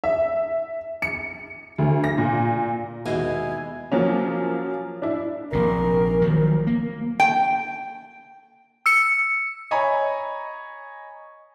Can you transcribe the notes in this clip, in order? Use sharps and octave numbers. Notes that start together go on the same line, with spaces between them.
E5
C#7
D2
A#6
A#2
D#2 G#2 B2 E4 F#4 C5 D#5 G#5
F3 F#3 A#3 C#4
D4 E4
A#1 C3 A#4
D#3 F3 F#3
A#3
G5
E6 C#7
C#5 D#5 G#5 A#5 B5